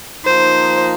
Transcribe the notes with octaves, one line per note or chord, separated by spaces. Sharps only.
F3 A#3 D#4 C5